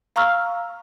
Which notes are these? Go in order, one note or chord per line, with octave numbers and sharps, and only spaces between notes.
F5 A#5 C#6 E6 F6